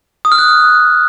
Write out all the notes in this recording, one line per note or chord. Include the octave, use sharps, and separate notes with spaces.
D#6
F6
F#6